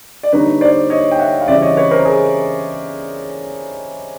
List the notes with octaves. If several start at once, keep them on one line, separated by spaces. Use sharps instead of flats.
D5
D3 G3 A#3 D#4 B4 C#5
C5 D5
C#5 D#5
G5
E5 F#5
F5
C#3 E3 G3 C4 E4 D5 E5
C#5 D#5
B4 C#5
A#4 C5
G#4 A#4